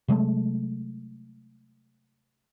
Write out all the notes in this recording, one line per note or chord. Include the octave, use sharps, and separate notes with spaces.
C3 F#3 G#3 A3